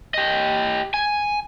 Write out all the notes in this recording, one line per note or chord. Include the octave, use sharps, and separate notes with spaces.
G4 D#5
G#5